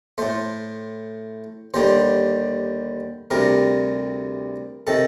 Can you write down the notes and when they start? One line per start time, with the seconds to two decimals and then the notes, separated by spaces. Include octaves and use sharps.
0.18 A2 A3 C5
1.74 D#2 D3 G3 C5
3.31 D2 C3 G3 A#4
4.87 C3 D#3 A4